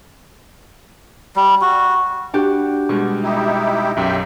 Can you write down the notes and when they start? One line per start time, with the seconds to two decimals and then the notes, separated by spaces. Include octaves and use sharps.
1.36 G3
1.62 F#4
2.34 D4 F#4 G4
2.89 B2 G3 G#3 C#6
3.23 D#4 E4 G4
3.96 B1 F#2 G4 E5 G5